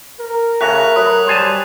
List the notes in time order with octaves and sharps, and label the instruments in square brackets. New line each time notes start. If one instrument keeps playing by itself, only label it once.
[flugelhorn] A#4
[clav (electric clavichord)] C#3 F#4 [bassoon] A3 [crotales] F#6 B6 F7
[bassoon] F#3 [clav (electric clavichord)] B4 [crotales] D#6
[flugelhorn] G3 [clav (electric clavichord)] C5 G#5 A5